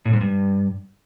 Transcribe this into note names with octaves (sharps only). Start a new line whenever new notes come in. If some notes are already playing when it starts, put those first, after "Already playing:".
A2
G#2
G2